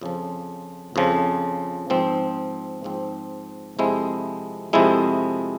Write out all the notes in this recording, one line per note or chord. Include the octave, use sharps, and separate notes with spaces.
F2 C#3 F3
F2 C#3 F3
G#2 F3 C4
G#2 F3 C4
F2 C3 F3 G#3 E4
F2 C3 F3 G#3 E4